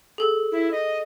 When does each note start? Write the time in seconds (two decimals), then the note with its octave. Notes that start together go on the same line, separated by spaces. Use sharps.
0.18 G#4 A4
0.52 E4
0.71 D#5